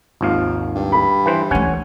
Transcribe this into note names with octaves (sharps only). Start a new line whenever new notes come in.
G#1 D#2 F3 F5
G2
B5
E3 B4 C5
E3 A3 C#4 F#5 G#5